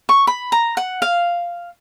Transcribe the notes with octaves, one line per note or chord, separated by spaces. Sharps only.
C#6
B5
A#5
F#5
F5